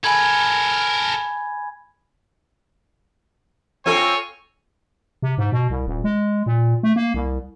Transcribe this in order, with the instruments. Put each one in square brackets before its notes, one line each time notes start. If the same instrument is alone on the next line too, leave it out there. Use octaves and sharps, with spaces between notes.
[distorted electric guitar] A4 A#4 [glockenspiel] G#5 B5 G#6
[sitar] C4 F4 A4 [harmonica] C#5 G#5
[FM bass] C3
G#2
B2
C2
D#1
G#3
A#2
A3
A#3
C2